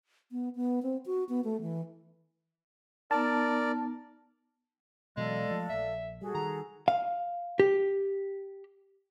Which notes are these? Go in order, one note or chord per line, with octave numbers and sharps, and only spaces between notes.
B3
B3
C4
F#4
B3
A3
E3
B3 D#4 A#4 D5 A5
B2 E3 F#3 G#3 A4 D5 F5
F3 A3
D#1 A#1 E5
G3 F#4 G#4 A4
D#3 G3 A#5
F5
G4